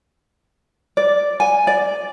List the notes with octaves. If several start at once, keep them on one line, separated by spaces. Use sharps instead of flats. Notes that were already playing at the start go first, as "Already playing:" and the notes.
D5
G#5
D5